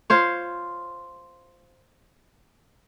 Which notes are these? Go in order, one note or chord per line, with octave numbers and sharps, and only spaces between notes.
F4 C5 C#5